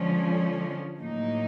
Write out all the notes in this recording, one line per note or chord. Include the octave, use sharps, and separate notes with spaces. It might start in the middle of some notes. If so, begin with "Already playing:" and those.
Already playing: D3 F3 G#3 C#4
A2 F#3 A#3 D#4